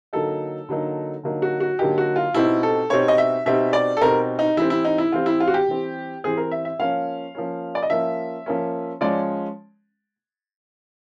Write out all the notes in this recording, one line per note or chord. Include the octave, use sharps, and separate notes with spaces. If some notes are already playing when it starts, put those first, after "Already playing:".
D3 F#3 A#3 D#4 A4
D3 F#3 A#3 D#4
D3 F#3 A#3 D#4
F#4
F#4
D3 F#3 A#3 D#4 G4
F#4
F4
B2 G3 C4 D#4 E4
A4
B2 G3 C4 D#4 C#5
D#5
E5
B2 G3 C4 D#4 E5
D5
A4
B2 G3 C4 D#4 A#4
D#4
E3 G3 C4 E4
E4
D#4
E4
E3 G3 C4 F4
E4
F4
F#4
G4
E3 G3 C4
E3 G3 C4 G#4
A#4
E5
E5
F3 A#3 C#4 F5
F3 A#3 C#4
D5
D#5
F3 A#3 C#4 E5
F3 A#3 C#4
F3 G#3 C#4 D5